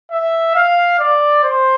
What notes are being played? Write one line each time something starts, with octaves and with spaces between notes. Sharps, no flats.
E5
F5
D5
C5